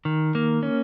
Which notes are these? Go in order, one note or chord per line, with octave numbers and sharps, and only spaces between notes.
D#3
A#3
C#4